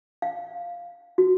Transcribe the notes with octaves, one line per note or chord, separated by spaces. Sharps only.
F5
F#4